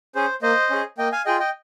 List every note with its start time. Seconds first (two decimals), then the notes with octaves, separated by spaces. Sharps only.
0.15 C#4 G#4 C5
0.42 A#3 C5 D#5
0.71 C#4 G#4
0.98 A#3 D#5 G5
1.12 F5 G#5
1.26 F4 G#4 D#5 G5
1.40 D#5 G5